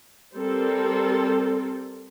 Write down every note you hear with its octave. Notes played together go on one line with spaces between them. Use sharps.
G3 C4 A4 A#4